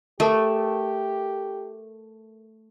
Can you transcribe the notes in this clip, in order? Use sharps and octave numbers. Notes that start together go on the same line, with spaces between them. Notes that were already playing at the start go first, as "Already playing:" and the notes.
A3 G4 A4 A#4 A5